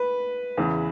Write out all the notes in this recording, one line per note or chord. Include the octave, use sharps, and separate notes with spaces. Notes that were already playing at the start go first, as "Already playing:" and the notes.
Already playing: B4
E2 C#3 E3